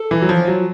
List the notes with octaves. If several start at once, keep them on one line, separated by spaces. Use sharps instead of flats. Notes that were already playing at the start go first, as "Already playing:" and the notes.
Already playing: A4
E3
F#3
F3
F#3